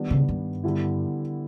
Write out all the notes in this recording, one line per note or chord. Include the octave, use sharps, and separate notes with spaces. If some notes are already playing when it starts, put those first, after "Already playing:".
Already playing: D#3 G3 B3 D4
C#3
G2
D3 G3 B3 E4